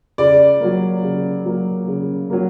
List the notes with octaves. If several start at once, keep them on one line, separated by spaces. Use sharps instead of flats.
C#3 D5
F#3 A#3
C#3
F#3 A#3
C#3
F#3 A#3